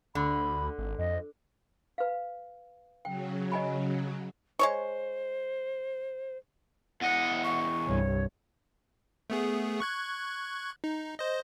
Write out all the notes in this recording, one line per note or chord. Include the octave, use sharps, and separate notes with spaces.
D2 D3 B5
G#1
F2 D#5
B4 F5
C#3 F#3 G5
D#5 G#5 B5
G#3 C5 C#5 C#6
E2 D#5 F#5
C#6
C2 G2 C#5
A3 B3 G#4
C#6 F#6 G#6
D#4
C5 D#5